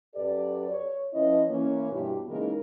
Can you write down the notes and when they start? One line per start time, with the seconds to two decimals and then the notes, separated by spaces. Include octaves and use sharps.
0.15 F#2 G4 A4 B4 D5
0.69 C#5
1.13 F3 C#4 E4 B4 C#5 D#5
1.48 E3 A#3 C#4
1.91 G2 B2 E4 G4
2.29 C#3 E3 G#3 A#3 D#4 A#4